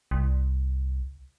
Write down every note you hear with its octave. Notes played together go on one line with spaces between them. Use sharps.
C2